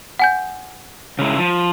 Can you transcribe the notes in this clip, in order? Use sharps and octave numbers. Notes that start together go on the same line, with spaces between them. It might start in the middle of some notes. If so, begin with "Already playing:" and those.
F#5 G#5 G6
C#3 G#3 E4
F3